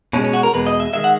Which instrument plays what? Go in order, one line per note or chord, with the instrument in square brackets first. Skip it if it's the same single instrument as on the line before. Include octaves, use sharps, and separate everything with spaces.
[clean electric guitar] B2 G#3 C#4
C#4
F#4
A#4
E2 B2 G#3 B4
D#5
E5
D#3 G#3 E5
F#5